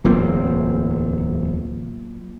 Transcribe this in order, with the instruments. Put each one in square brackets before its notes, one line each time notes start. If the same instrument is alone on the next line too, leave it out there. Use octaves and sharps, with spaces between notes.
[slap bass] D1 E2 C4 [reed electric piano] F#3 A#3 F4